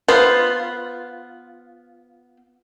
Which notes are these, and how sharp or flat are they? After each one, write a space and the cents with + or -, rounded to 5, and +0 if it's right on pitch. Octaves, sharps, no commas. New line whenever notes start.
B3 +0 F4 +0 C5 -10